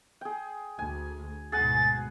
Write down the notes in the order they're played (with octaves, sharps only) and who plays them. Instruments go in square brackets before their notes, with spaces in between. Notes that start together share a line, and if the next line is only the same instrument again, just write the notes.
[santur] G#4 G5
[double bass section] D2 [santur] G#5
[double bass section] D2 G#2 B2 [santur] G#4 F#5 G#5 [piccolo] A6